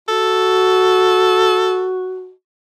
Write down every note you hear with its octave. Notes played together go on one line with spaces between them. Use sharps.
F#4 A4